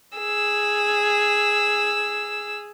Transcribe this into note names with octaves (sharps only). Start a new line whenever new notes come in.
G#4 E6